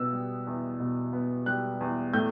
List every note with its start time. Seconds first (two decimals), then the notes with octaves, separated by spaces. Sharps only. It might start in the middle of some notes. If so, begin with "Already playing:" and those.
Already playing: B2 B3 E6
0.13 G3
0.47 E2
0.80 B2
1.13 B3
1.46 G3 F#6
1.81 E2
2.13 A2 G6